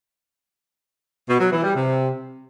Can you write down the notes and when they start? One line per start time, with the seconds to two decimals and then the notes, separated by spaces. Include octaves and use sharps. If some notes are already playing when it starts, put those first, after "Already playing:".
1.29 B2
1.40 F#3
1.52 E3
1.63 G3
1.75 C3